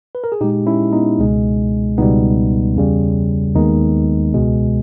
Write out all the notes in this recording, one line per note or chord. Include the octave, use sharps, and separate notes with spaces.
B4
A#4
G#4
A#2 G#3 D#4 G4
C#4 E4
B3 D#4
C#2 B2 G#3
C#2 B2 G3 B3 D#4
E2 C#3 G3
D#2 D#3 G#3 B3 D#4
C#2 B2 G#3